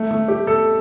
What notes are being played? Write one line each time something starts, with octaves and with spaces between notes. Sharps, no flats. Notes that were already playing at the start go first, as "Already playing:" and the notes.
Already playing: A3
A3
G4
A4